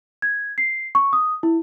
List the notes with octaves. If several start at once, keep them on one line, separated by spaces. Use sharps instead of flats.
G#6
C7
C#6
D#6
E4